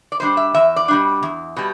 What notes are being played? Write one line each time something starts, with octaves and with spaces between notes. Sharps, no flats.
D5
B2 G3 D4 C5
E5
E2 E5
D5
B2 G3 D4
E2
B2 G3